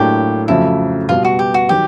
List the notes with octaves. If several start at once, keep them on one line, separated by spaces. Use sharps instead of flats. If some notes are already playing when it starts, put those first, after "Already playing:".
Already playing: A2 F#3 A#3 D4 G4
F2 C#3 F#3 A3 C4 E4
B2 G3 B3 F4
F#4
G4
F#4
D#3 F#3 G4